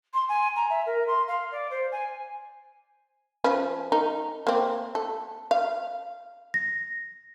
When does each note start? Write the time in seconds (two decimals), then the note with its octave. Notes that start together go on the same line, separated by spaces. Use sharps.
0.14 C6
0.29 G#5
0.56 A#5
0.70 E5
0.86 A#4
1.07 C6
1.28 F5
1.52 D5
1.70 C5
1.92 G#5
3.44 F3 C#4 B4
3.92 D#4 A#4
4.47 A#3 C4
4.95 A4
5.51 F5
6.54 A#6